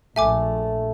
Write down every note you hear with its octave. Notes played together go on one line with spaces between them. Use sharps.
A#1 A3 E5 G#5 D6